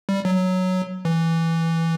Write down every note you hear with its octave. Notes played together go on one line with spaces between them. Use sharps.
G3
F#3
E3